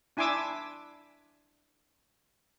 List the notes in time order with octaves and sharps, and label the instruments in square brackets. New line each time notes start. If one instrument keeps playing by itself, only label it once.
[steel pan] D4 E4 G#5 C6 D6 E6